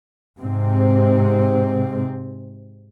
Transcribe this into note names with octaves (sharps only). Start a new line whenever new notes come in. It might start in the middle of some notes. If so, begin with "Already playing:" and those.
G#2 C3 C4